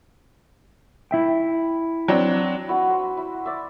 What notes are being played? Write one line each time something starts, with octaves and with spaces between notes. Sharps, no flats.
E4 E5 G5
F#3 C4 D4
E4 F#4 B4
C5
E4
D5 E5